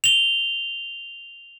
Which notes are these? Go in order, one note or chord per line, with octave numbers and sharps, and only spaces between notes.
F7 G7